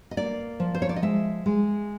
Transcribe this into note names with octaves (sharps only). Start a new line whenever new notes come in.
D#5
A#3 D5
F3
C5
C#5
D5
D#5
G#3 E5
G#3